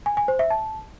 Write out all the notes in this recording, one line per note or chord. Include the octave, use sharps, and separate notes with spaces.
G#5
G#5
C5
E5
A5